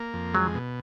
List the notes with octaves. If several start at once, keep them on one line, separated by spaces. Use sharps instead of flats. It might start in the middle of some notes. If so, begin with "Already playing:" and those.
Already playing: A#3
F2
F#3 G#3
B2